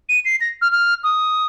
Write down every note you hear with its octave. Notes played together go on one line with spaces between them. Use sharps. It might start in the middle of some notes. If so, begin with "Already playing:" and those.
D#7
C7
A#6
F6
F6
D#6